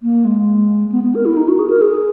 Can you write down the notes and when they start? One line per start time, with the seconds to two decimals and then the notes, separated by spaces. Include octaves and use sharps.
0.03 A#3
0.25 G#3
0.92 B3
1.03 B3
1.15 A#4
1.26 E4
1.37 D#4
1.48 F#4
1.59 G#4
1.70 A#4
1.82 G#4